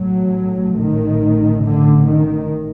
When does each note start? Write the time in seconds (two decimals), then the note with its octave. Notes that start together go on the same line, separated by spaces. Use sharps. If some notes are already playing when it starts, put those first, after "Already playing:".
Already playing: A1 A2 F#3
0.77 D#3
1.64 D3
2.07 D#3